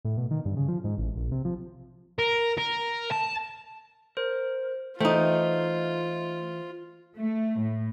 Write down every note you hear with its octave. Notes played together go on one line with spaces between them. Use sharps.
A2
B2
D#3
G2
C#3
F3
G#2
A1
A#1
C3
F3
A#4
A#4
A5
A#4 C5
E3 A3 D#4 F4 C5 G5
A3
A2